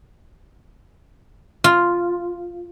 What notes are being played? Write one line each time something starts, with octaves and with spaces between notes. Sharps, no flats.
F4